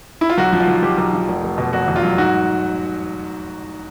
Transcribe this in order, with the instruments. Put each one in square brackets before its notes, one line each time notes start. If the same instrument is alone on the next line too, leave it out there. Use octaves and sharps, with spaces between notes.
[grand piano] E4
F4
B1 F#4
F3
F4
B1
B1 G4
B1
F3
F1
F1
B2
F1 F#4
E2
F4
F#3
G#2 F#4